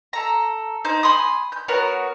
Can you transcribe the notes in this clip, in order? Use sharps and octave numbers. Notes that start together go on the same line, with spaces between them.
A4 A#5
D#4 C5 G6
G#5 B5 C6 D#6
G6
B3 F#4 A#4 C#5